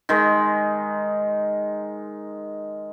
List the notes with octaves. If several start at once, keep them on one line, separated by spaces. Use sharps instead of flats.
D#3 G#3